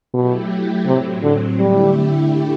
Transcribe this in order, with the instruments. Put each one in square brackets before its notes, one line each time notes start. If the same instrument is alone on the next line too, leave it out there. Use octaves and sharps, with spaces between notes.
[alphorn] B2 [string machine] F#3 A3 E4 G4
[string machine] A2 F#3 C4 [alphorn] C3
[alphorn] D3
[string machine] D3 A3 E4 G4 [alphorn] G3